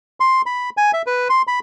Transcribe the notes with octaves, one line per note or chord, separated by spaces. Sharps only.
C6
B5
G#5
E5
B4
C6
B5